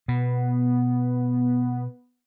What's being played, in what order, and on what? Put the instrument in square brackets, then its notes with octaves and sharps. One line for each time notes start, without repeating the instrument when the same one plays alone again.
[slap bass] B2 [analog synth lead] B3